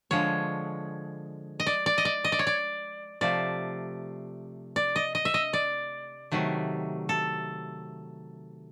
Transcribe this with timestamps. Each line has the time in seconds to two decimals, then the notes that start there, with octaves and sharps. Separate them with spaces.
0.11 D3 F3 G#3 C#5
1.60 D#5
1.67 D5
1.86 D5
1.98 D#5
2.05 D5
2.24 D#5
2.32 D5
2.39 C#5
2.47 D5
3.21 C3 F3 A3 D5
4.76 D5
4.96 D#5
5.15 D#5
5.25 E5
5.34 D#5
5.53 D5
6.32 C3 D#3 F#3 A3
7.09 A4